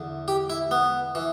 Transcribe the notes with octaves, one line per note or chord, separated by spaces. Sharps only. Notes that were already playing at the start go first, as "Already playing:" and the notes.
Already playing: E2 D3
G4
E4
B3
E3